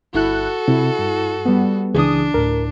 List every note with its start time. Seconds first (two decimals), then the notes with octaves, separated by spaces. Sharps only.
0.14 G1 E4 F#4 A4 F#6
0.68 C3 E4
0.99 G2
1.45 G3 B3
1.94 C#2 C#3 E3 D4 G#4 D#6
2.34 D2 A2 A#4